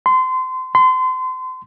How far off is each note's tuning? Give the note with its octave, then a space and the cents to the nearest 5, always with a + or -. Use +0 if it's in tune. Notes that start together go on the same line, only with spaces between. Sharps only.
C6 -30
C6 -35